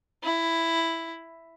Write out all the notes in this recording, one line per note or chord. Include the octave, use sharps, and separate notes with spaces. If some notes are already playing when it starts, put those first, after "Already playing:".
E4